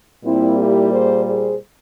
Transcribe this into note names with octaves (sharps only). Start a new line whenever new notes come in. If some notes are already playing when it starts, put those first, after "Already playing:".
A#2 G3 A#3 C4 E4
E4 G4
G#4 C5
G#4 C5